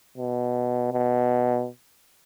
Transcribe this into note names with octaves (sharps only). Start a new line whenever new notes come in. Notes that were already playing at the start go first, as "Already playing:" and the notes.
B2
B2